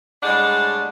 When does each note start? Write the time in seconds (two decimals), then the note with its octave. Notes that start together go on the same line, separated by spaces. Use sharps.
0.23 A2 G3 G#3 D4 D5 F#5